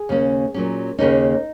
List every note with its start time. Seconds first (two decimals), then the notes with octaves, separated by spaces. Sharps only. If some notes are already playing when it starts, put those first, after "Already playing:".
Already playing: G#4
0.09 D#2 C#3 A#3 C#4
0.54 A#2 F#3 C#4
0.98 D#2 C#3 A#3 C#4 D#4